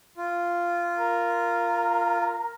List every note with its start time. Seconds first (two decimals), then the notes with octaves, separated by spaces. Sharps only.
0.17 F4
0.98 A#4